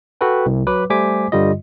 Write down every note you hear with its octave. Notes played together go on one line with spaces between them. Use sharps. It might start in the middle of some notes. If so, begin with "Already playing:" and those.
F#4 A4 B4 G5
C2
F#3 B4 D6
G3 A3 C5 G#5 D6 B6
G2 D3 G3 F4 D#5